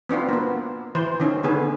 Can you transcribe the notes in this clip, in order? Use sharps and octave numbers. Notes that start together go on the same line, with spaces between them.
B3 C4 D4 F4
A#3 B3
E3 C5
D#3 C#4
D3 B3 G#4